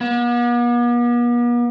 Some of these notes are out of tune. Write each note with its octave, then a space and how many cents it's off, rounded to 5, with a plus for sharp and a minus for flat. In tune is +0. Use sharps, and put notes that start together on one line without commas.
B3 -45